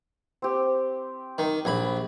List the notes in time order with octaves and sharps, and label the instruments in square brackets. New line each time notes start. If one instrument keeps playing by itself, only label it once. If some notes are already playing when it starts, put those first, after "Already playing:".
[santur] C4 G4
[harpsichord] D#3
A#1 B5